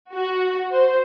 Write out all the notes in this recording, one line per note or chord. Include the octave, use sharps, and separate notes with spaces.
F#4
C5